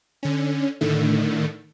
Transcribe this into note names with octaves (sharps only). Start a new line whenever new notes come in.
D3 C#4
A2 D3 D#3 A3